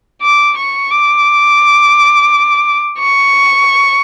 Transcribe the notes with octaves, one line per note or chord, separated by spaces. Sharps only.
D6
C#6
D6
C#6